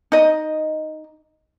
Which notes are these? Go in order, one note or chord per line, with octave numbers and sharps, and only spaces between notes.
D#4 D#5